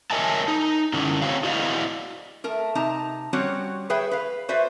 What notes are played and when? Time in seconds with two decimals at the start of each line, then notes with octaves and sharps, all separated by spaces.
0.11 A#4 C#5 D#5 E5 G#5 A5
0.48 D#4
0.94 D3 C#4 D4 E4
1.22 C4 F#4 C#5 F5
1.43 E4 F#4 C5 D5 D#5 F5
2.44 A3 A#4 A5
2.75 C3 D#4 A5 A#5
3.33 G3 C4 C#4 F#4 C#5 F#5
3.90 G#4 B4 C#5 E5 G5
4.11 B4 F5
4.49 F#4 B4 C5 D5 E5